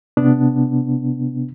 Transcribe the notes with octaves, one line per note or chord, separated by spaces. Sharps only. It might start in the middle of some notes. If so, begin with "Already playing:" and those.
C3 B3 D4